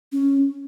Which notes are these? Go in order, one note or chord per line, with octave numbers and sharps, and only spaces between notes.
C#4